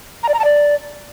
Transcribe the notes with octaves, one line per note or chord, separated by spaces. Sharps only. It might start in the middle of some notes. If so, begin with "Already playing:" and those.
A#5
D5
A#5
A5
D5